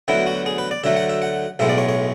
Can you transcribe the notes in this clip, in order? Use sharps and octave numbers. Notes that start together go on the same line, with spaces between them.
D2 D3 F#3 B3 E4
F#4
G#4
B4
D5
D2 D3 F#3 A3 E5
F#5
E5
F#5
B1 A2 G#3 B3 E5
D5
C#5
C#5